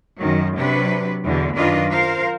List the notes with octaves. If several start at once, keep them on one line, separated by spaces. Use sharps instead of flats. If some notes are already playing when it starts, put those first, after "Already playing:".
F#2 D#3 F#3
C3 F#3 D4 B4
E2 B2 D3
F#2 D#3 D4 F4 B4 D#5
F4 A#4 C5 F5